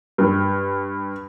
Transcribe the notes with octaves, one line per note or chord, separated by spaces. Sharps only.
G2